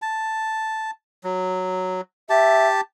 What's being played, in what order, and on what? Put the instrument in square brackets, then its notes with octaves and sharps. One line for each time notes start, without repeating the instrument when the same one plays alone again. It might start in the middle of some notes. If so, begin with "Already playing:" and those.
[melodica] A5
F#3
[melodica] G4 A5 [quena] E5